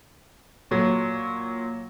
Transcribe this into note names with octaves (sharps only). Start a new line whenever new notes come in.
A#2 F#3